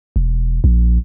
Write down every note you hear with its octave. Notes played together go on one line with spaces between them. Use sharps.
E1
A#1